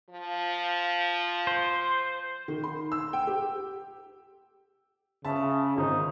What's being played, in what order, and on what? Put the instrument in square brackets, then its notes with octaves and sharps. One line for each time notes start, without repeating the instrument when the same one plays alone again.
[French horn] F3
[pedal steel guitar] C5
[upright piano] D#3
C6
E6
G5
G4
[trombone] C#3 [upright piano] E5 A5
[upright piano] G#1 [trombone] D#4